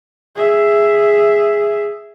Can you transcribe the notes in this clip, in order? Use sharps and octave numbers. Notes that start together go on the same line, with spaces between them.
G#4 E5